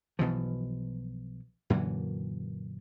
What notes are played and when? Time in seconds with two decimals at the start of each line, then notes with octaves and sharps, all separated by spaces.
0.19 B1 B2 E3 F3
1.70 F#2 A#2 D3 E3